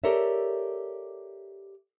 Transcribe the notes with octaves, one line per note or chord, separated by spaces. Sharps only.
G4 A4 A#4 C#5 D5 E5